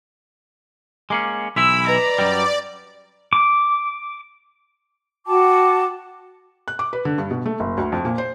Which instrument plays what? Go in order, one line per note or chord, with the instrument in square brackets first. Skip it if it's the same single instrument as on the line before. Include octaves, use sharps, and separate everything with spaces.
[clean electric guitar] G#3 A#3 C#4 [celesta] D6 C7 F#7
[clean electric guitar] B1 E3 E4 [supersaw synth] B5 [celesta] C6 B6 F7 [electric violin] E6
[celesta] B4 D#5 [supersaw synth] D5 [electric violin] A#5
[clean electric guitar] F#2 F#3 G3
[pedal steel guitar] D6
[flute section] F#4 G5 A5 D6
[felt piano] F#6
D6
B4
D3
G2
B2
A3
F#1
D2
F2
A#2
C5